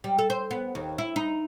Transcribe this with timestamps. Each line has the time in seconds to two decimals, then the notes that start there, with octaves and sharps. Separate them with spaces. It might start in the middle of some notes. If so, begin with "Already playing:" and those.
0.04 G3
0.18 A4
0.30 C5
0.51 B3
0.75 D#2
0.98 E4
1.16 D#4